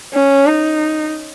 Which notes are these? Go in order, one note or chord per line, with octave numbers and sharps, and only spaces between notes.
C#4
D#4